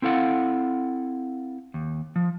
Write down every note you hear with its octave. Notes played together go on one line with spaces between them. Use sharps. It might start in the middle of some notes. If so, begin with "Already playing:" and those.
C4 E4 A4 F5 F#5
D#2
F3